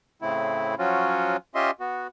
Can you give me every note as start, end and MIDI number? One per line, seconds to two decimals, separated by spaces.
0.22 0.75 45
0.22 0.75 49
0.22 0.75 57
0.22 0.75 60
0.22 0.75 64
0.79 1.37 53
0.79 1.37 54
0.79 1.37 61
0.79 1.37 65
0.79 1.37 66
1.55 1.71 61
1.55 1.71 65
1.55 1.71 67
1.55 1.71 75
1.55 1.71 76
1.55 1.71 84
1.80 2.07 59
1.80 2.07 66